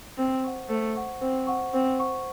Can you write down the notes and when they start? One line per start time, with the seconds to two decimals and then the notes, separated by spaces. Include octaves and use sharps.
0.18 C4 C5
0.44 F#5 C#6
0.69 A3 C5
0.95 F#5 C#6
1.21 C4 C5
1.47 F#5 C#6
1.73 C4 C5
2.00 F#5 C#6